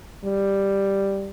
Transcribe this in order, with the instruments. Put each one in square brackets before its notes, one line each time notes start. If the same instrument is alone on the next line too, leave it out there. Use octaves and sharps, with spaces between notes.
[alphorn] G3